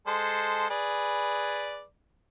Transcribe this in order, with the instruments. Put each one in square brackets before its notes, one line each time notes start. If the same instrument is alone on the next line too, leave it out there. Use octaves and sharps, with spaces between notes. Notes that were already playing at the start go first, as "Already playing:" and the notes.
[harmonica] G#3 A4 C5
G#4 B4 D5